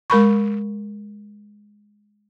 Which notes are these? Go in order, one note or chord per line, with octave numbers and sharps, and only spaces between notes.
G#3 A#4 B5 C#6